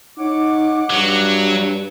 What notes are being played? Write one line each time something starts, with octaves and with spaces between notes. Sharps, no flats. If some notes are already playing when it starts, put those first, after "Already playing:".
D#4 C#5 F#5 D6
G2 F#3